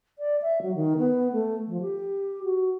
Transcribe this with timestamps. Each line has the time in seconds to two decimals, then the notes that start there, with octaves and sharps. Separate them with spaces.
0.19 D5
0.42 E5
0.62 F#3
0.75 D#3
0.98 B3
1.33 A3
1.68 F3
1.81 G4
2.44 F#4